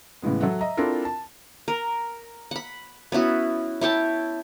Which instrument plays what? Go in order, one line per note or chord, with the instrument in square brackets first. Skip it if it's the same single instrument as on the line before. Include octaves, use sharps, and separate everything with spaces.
[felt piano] A2 C#3 E3 G#3 B3
F#3 A4 E5 F#5
D#5 E5 A#5
C4 D4 E4 F4 A4 A#4
A5
[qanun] A#4
F#5 B5
B3 C#4 E4 F#4
E4 C#5 G5 A5